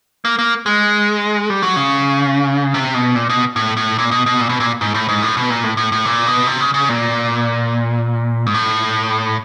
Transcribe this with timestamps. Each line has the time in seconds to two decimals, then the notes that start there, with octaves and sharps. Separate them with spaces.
0.25 A#3
0.39 A#3
0.66 G#3
1.50 G3
1.63 F#3
1.76 C#3
2.74 C3
2.94 B2
3.16 A#2
3.29 B2
3.56 A2
3.77 A2
3.98 A#2
4.11 B2
4.26 B2
4.41 A#2
4.49 B2
4.60 A#2
4.81 G#2
4.94 A2
5.09 G#2
5.22 A2
5.37 B2
5.50 A#2
5.64 A2
5.77 A2
5.92 A2
6.05 A#2
6.27 B2
6.47 C3
6.61 C#3
6.74 C#3
6.89 A#2
8.46 G#2
8.54 A2